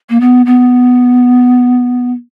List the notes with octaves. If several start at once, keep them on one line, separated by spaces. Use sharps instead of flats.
A#3
B3
B3